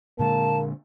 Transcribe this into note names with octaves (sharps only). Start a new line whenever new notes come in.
A#2 D3 G#3 A#3 A5